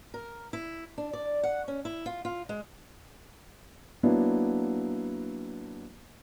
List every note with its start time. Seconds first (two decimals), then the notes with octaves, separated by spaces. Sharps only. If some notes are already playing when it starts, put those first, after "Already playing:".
0.14 A#4
0.53 E4
0.98 D4
1.13 D5
1.43 F#5
1.68 C#4
1.85 E4
2.06 F4
2.25 F4
2.49 G#3
4.03 F#3 A#3 B3 D4 E4